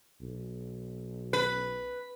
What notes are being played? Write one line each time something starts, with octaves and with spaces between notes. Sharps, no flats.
B1
B4